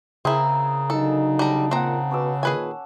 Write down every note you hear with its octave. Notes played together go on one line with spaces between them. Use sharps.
C#3 C4 E4 G#4 A#4
D3 F#3 D#4 A4
G3 A5 A#5
A#2 C4 D#4 F#5 A#5
B2 B3 C#4 D6 E6
A#2 D#3 G#4 B4 G#5